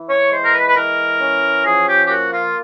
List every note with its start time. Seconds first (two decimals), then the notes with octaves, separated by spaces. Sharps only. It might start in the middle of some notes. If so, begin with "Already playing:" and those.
Already playing: E3
0.10 C#5
0.32 G#3 C5
0.44 A#4
0.54 B4
0.68 B4
0.76 E3 A#4
1.21 C#4
1.66 F3 G#4
1.89 G4
2.06 G4
2.10 A#3 F#4
2.33 F4